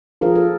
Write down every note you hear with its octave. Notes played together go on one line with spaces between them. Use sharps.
F3 G#4 A#4
A4